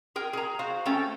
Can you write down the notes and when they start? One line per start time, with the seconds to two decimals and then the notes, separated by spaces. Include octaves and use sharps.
0.16 G#4 A#4 G5
0.33 G#4 A#5
0.59 F#4 C5 F5
0.86 A3 C#4 A4 G5